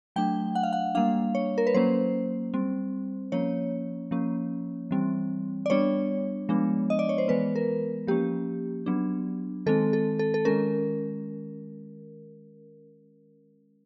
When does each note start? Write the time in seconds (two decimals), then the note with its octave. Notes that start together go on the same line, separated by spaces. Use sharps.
0.16 F#3 A3 D4 G5
0.55 F#5
0.63 F5
0.73 F#5
0.95 G3 A#3 D4 F5
1.35 C#5
1.58 A#4
1.67 B4
1.74 F#3 A#3 C#4 C5
2.54 G3 C4
3.32 F3 A#3 C#4 C#5
4.11 F3 A#3 C#4
4.91 E3 G3 C4
5.66 D5
5.70 G3 B3 D4 C#5
6.49 F3 G#3 B3 D4
6.90 D#5
6.99 D5
7.09 C#5
7.18 C5
7.28 E3 G#3 B3 B4
7.56 A#4
8.07 F3 A#3 C#4 G4
8.86 F#3 B3 D4
9.66 D#3 G#3 C4 A4
9.93 A4
10.19 A4
10.34 A4
10.45 D#3 G#3 C#4 A#4